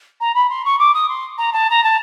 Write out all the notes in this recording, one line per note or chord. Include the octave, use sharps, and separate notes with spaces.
A#5
B5
C6
C#6
D6
D#6
C6
A#5
A5
A#5
A5